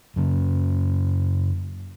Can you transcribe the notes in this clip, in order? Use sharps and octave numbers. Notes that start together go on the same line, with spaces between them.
F#2 C#3